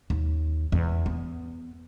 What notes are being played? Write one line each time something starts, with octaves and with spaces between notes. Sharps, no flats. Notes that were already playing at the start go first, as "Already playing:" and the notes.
D#2
E2
B3